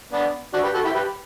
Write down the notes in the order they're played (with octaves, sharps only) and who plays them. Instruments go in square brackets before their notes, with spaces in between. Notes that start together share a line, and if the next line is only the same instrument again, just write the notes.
[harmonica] B3 D4
D4 F#4
G4 B4
F#4 A4
E4 G4
G4 B4